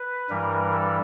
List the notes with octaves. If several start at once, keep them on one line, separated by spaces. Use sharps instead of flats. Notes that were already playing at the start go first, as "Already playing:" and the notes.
Already playing: B4
G2 E3 G3 A#4
A4